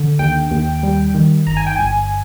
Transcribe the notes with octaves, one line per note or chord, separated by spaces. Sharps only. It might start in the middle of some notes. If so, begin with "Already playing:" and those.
Already playing: D3
D#2 G5
D#2
G3
D#3
G1 A#5
G#5
G5
G1 G#5